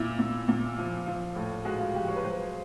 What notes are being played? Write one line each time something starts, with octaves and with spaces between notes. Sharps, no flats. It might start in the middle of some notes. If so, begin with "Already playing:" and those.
Already playing: A#2 E4
A#2
A#2
F3
F3 F4
A2
G#3 F#4
F4
F3 G4
C#5
B4
F#3 C5